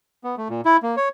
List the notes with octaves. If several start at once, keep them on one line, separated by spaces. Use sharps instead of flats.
B3
A3
A#2
E4
A#3
C#5